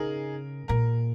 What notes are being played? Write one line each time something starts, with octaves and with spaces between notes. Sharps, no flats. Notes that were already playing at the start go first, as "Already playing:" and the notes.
Already playing: C#3 D#4 G#4 A#4
A#2 A#4